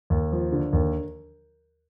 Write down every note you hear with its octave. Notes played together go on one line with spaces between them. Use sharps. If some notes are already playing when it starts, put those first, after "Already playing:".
D#2
F3
D3
D#2